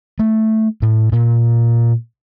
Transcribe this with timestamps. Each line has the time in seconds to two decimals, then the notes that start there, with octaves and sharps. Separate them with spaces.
0.19 A3
0.82 A2
1.12 A#2